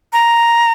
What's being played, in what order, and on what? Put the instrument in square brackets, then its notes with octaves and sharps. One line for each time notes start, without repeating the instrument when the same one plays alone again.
[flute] A#5